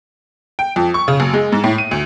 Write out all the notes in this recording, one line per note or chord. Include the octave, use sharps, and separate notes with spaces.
G5
F2
C#6
C#3
F#1
G#3
G#2
A2
D#7
D2